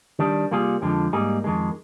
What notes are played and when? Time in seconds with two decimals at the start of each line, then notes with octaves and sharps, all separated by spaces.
0.19 D#3 G3 D4
0.51 C3 G3 A#3 F4 G#4
0.82 F2 D3 F3 G#3
1.13 G#2 G3 A#3 D#4 G#4
1.44 F2 D#3 G#3